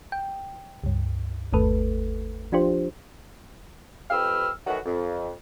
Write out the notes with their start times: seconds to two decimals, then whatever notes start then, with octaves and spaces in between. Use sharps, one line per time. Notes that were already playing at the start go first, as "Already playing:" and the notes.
0.12 G5
0.84 C#2 G2
1.53 G1 D#2 A3 A4 B4
2.52 F3 D4 F4 G4 C5
4.11 F2 G4 B4 G5 E6 F6
4.67 A2 D#3 E3 F#4
4.86 F2